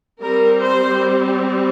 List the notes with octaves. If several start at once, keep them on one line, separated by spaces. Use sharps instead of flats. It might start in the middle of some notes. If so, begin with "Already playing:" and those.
G3 C4 A#4
C5